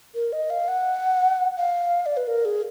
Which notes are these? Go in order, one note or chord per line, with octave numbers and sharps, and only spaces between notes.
A#4
D#5
F5
F#5
F5
D5
B4
A#4
G#4